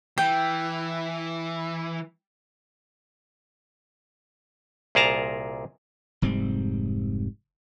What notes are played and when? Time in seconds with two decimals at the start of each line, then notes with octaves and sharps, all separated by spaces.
0.18 E3 G5
4.95 C2 A#2 G#4 A#4 A5 A#5
6.22 F1 G#2 G3 C4